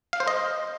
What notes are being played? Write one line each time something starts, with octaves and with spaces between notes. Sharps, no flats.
F5
C5
D#5